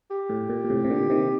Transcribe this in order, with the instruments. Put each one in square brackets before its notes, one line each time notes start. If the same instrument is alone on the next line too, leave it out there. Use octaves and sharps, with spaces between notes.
[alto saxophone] G4
[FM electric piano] A2
A#2
A#2
A2 C3
C3
A#2 D3
C3 D#3